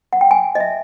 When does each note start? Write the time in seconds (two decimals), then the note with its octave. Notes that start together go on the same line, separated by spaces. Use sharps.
0.13 F#5
0.21 G5
0.31 G#5
0.55 D#5
0.60 E5